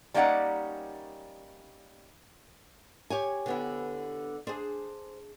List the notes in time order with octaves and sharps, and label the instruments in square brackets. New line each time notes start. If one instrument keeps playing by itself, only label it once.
[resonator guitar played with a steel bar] G3 A#3 C#4 D#4 D5 F#5
[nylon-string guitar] G4 C#5 G#5
[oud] D3 B3 E4
[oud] D4 G#4 [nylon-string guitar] C5